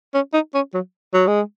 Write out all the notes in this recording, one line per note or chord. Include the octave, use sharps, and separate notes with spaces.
C#4
D#4
C#4
F#3
F#3
G#3